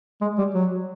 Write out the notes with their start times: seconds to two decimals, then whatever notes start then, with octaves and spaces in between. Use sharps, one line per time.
0.21 G#3
0.38 G3
0.55 F#3